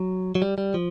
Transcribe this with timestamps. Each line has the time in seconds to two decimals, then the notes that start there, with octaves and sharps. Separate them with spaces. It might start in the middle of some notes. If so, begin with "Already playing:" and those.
Already playing: F#3
0.35 F#3
0.42 G3
0.58 G3
0.74 F3